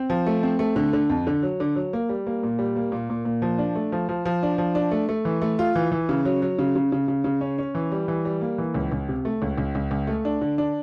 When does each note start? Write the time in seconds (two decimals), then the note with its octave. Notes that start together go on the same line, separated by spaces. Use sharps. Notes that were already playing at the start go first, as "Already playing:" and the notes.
Already playing: C4
0.10 F3
0.26 A3
0.43 C4
0.59 A3
0.76 D3
0.93 D3
1.10 F2
1.27 D3
1.43 F#3
1.60 D3
1.76 F#3
1.93 A#3
2.09 G3
2.27 A#3
2.43 A#2
2.59 G3
2.76 A#3
2.92 A#2
3.10 A#2
3.25 A#2
3.42 F3
3.58 D4
3.75 A3
3.92 F3
4.09 F3
4.25 F3
4.43 D4
4.58 F3
4.75 D4
4.91 A3
5.09 A3
5.25 E3
5.42 A3
5.59 F4
5.75 E3
5.92 E3
6.09 C#3
6.25 F#3
6.42 F#3
6.59 C#3
6.76 C#3
6.92 C#3
7.08 C#3
7.24 C#3
7.41 C#4
7.58 C#4
7.75 E3
7.92 G3
8.08 E3
8.25 G3
8.41 A#3
8.58 E3
8.74 C#2
8.92 C#2
9.09 C3
9.25 A3
9.42 C#2
9.58 C#2
9.75 C#2
9.91 C#2
10.07 A3
10.25 D4
10.41 D3
10.58 D4